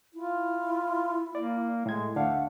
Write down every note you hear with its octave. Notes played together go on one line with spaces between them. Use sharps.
E4 F4
A#3 D5
A2 G#3 G#6
D2 A3 D4 F5 F#5